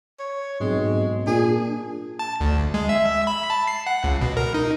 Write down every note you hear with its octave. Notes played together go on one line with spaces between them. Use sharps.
C#5
B1 G#2 G#3 C4
A#2 D4 G#4
A5
D2
G#3
E5
B5
A5
C7
F#5
C#2
B2
A#4
D#4